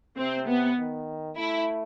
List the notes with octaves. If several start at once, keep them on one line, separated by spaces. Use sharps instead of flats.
C3 C4
B3
D#3
A3 E4